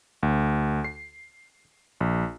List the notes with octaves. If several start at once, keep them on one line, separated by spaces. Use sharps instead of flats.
D2
C7
A#1